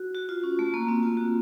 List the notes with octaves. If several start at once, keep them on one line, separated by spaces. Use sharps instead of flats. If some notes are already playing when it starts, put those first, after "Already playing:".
Already playing: F#4
F#4
F4
C#4
A3
A#3
C4
F4
F#4